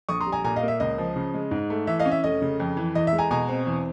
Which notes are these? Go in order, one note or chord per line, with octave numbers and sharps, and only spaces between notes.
A#1 C#6 D#6
A#5 C6
G3
G#5 A#5
A#2 G#5 A#5
D#5 F5
A#3
E5
C#2 D#5
F3
C#3
G#3
G#2
A3
E3 E5
D#5 F5
C#4
E5
F1 D#5
C#3
F2
E3
E2 D#5
E5
G#3
G#5 A#5
B2 G#5 A#5
C4
E2